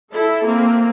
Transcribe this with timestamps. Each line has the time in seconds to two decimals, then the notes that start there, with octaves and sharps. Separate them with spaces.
0.13 E4 A4
0.47 A#3 C4